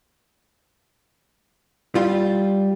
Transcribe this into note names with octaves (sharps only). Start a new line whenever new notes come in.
G3 F4